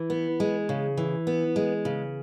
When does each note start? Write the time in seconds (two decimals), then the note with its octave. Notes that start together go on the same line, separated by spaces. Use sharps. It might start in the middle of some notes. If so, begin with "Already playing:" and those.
Already playing: E3
0.10 B3
0.40 G#3
0.69 C#3
0.97 E3
1.27 B3
1.56 G#3
1.85 C#3